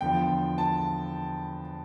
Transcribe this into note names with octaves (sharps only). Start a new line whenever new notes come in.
E2 D3 F3 G5
A5